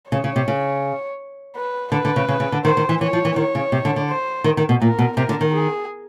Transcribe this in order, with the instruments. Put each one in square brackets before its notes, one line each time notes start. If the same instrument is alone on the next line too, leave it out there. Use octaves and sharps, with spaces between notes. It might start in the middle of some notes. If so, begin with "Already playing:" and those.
[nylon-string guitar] C#3 [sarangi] C#5
[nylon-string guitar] C#3
C3
C#3
[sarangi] B4
[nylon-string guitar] D3 [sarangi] B4
[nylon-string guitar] D3
C#3
C#3
C#3
D3
[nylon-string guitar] D#3 [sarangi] C5
[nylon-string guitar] D#3
E3
[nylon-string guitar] E3 [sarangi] C#5
[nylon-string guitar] F3
E3
[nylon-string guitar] D#3 [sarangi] C#5
[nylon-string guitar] C#3
C3
D3
D3
[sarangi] C5
[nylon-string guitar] D#3
D#3
B2
[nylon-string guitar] A#2 [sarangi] A#4
[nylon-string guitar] B2
[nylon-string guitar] C3 [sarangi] A#4
[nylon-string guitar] D3
D#3
[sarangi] G#4